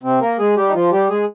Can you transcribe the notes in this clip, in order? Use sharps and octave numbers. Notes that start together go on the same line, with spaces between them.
C3 C4
A#3 A#4
G#3 G#4
G3 G4
D#4
F3 F4
G3 G4
G#3 G#4